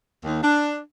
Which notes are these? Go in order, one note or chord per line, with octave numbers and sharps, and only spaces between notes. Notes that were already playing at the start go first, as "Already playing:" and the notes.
D#2
D4